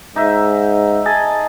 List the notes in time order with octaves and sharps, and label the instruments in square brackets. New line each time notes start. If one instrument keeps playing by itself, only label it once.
[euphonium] G#2 [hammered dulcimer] D#4 E5
[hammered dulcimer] G#4 D#5 A5